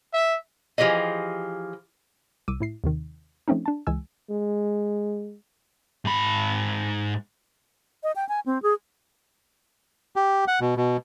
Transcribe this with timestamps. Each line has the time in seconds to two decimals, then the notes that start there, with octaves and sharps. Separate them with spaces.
0.13 E5
0.78 E3 F3 G4 G#4 D#5
2.48 C2 D6 E6 D#7
2.60 A2 E4 C7
2.84 D#2 C3 D#3
3.48 F3 A3 C4 C#4 D#4
3.66 D4 A5
3.87 C#2 E3 G#3 G#5 E6
4.31 G#3
6.05 G#2 B5
8.03 D#5
8.16 G5
8.29 G#5
8.46 C4
8.62 G#4
10.16 G4
10.48 F#5
10.61 B2
10.77 B2